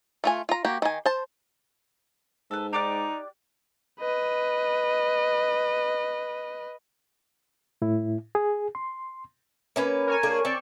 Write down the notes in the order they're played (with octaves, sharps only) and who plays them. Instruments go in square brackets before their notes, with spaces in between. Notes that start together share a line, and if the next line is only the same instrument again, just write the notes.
[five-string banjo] A3 F4 G#5
F4 A#5
A#3 F#4 G4
D#3 G#5
C5 A5
[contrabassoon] G#2 [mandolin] A4 B4
[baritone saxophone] D#4 [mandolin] G4 D5 F#6
[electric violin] B4 D#5
[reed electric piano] A2 E4
G#4
C6
[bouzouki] A#3 C#4 B4
[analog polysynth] A#4 C#5 G#5
[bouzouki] A#3 D4 G#4
[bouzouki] C4 [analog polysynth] D5 C#6